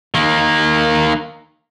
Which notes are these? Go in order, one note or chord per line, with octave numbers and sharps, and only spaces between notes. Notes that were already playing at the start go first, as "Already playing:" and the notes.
D#3 A#3